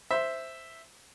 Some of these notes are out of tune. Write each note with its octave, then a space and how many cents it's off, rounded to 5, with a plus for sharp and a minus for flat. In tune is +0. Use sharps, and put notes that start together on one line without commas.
C5 +0 E5 +0